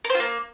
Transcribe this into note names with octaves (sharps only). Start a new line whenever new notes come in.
A#4
C5
F4
A#3